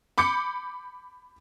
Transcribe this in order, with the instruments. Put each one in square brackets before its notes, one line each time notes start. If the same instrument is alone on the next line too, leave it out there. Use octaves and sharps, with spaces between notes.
[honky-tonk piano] B5 D6 G6 C#7